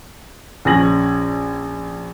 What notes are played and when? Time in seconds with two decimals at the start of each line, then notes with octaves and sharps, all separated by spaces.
0.65 A#1 C#4 G#5 A#6 F#7